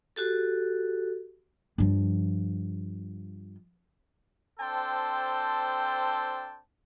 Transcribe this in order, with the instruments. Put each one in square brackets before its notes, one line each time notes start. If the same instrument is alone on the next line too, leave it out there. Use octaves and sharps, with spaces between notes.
[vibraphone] F#4 G4 A4
[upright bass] G2 F3
[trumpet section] C4 D4 A4 C5 G5 A5